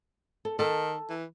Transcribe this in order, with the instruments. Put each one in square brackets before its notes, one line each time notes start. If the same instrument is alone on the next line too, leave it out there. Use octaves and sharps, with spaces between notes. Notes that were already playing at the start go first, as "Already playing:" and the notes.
[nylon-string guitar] A4
[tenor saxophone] D#3 [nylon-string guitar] A4 A5
[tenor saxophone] E3